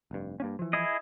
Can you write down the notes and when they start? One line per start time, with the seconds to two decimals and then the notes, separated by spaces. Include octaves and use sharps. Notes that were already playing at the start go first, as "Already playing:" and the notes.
0.11 F1 G2
0.40 G2 A#3 C#4
0.59 E3 F3
0.73 E4 G#4 D#5